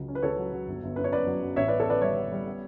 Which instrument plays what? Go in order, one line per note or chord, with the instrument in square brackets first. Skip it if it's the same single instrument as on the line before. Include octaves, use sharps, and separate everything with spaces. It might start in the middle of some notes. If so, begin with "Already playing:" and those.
Already playing: [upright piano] C#2 C#3 F#3
C#4
B4
C#2 A4 C#5
F#3
F#3
G1
G1
F#2 B4
C#5
F#2 B4 D5
F#3
F#3
A1 C#5 E5
B3 B4 D5
A4 C#5
B3 B4 D5
G3 C#5 E5
B3
G3
B3